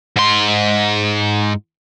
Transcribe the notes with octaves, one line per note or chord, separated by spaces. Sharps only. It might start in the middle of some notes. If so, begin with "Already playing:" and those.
G#2 C6